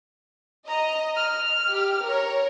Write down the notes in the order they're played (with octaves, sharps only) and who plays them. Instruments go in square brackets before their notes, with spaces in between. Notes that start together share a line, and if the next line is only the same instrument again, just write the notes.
[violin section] D#5 [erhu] A#5
[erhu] F6
[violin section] G4
A#4 C#5